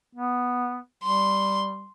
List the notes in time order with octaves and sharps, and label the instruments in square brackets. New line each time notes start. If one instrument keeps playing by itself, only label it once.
[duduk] B3
[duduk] G3 [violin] C6